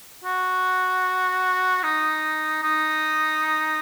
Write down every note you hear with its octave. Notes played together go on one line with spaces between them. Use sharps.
F#4
D#4
D#4